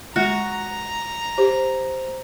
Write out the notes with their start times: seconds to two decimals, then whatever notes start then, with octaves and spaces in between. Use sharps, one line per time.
0.16 G#3 F#4 A#5
1.38 G4 C5